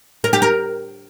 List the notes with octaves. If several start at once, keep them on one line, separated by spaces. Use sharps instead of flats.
A#4
G4
A#4